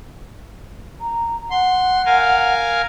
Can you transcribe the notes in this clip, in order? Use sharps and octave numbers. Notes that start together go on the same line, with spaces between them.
A#5
F#5 C6
A#4 F5 G#5